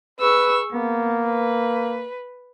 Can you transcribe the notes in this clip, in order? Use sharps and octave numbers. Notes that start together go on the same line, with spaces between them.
G#4 B4 C#6 E6
A#3 B3
B4